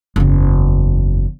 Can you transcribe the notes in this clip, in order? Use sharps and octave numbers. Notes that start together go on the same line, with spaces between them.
F#1 E2